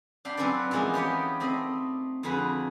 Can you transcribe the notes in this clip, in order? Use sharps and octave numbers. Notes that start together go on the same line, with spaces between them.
D4 F5 G5 B5
F#3 C4 C#4 F#4 B4 D5
E3 F3 G#3 A#3 B3 D#4
B3 G4 C#5 G5
A3 C4 D#5 B5
F2 D3 F#4 G#4 B4 B5